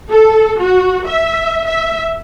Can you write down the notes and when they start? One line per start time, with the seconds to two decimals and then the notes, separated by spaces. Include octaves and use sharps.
0.10 A4
0.59 F#4
1.06 E5
1.65 E5